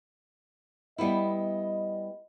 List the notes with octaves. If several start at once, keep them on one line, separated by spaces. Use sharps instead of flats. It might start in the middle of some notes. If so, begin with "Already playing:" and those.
G3 B3 E4 D#5